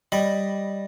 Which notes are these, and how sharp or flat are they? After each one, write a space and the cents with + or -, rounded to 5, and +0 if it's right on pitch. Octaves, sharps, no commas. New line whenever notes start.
G3 +0 D#5 +0 B5 +0